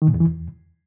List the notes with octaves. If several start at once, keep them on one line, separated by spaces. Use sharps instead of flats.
D#3
A#2
E2
E3
E2